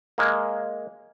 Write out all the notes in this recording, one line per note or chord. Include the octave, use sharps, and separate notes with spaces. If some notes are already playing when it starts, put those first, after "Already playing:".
G#3 A#3